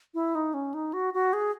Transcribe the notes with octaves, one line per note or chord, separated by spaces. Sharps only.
E4
D#4
C#4
D#4
F#4
F#4
G#4